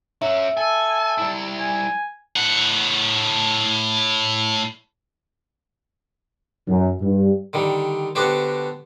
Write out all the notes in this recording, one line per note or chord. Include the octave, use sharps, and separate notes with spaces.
C#4 F#4 E5
A4 G#5
G3 E4
G#5
A2 F#5
F#2
G2
D3 D#3 G3
D3 B3 D4 F#4 G4 C5